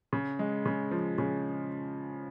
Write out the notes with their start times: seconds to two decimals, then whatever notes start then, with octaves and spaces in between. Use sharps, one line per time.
0.13 C#3
0.39 G#3
0.66 C#3
0.91 F3
1.18 C#3